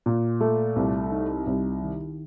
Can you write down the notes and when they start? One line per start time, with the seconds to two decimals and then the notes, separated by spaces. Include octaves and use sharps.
0.06 A#2
0.41 A3
0.76 C2
1.12 D#4
1.47 C2
1.82 D#3